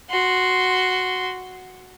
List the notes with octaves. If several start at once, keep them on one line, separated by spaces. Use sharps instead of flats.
F#4 C6